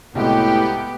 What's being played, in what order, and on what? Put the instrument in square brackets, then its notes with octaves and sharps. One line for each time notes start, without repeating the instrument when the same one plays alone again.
[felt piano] C2 G#3 F#4 [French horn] A2 [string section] B3 G4